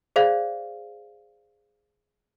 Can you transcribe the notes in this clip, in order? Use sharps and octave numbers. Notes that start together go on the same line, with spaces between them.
G#4 C5 D5 F5